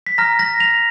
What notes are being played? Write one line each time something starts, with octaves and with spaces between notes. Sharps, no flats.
B6
A#5 F6 A#6
A#6
F7